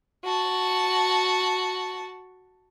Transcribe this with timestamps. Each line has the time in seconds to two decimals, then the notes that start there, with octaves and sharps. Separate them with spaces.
0.24 F#4 A5